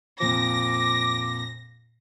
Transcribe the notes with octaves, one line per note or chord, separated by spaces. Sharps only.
F2 A#2 F3 D6 A#6